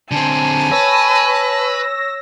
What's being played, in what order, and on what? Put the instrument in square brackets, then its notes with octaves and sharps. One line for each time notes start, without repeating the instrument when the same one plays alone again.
[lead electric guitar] D3 C4 [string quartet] G#5 [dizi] A5
[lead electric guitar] B4 [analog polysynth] C#5 E6 A#6